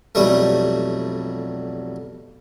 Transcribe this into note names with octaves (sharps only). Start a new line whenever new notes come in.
B1 F2 G3 A3